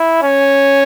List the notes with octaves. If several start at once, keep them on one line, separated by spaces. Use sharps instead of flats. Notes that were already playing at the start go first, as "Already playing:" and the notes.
Already playing: E4
C#4